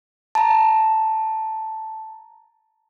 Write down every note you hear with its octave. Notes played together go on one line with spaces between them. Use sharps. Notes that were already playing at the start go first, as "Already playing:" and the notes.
A5 A#5